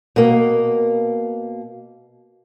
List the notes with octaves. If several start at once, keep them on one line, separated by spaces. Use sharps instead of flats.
B2 A#3